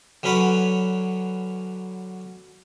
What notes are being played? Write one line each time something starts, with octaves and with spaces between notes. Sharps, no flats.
D3 F#3 C#4 B4 C#5